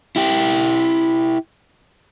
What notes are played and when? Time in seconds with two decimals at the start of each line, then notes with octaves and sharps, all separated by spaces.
0.16 E4 G4